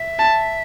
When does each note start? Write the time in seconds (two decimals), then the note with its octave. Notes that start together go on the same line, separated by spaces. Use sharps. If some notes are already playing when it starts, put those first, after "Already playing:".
Already playing: E5
0.19 A5